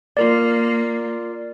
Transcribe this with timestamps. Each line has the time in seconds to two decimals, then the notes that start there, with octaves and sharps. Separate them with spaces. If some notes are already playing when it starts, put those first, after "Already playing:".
0.17 A#3 F4 A#4 D5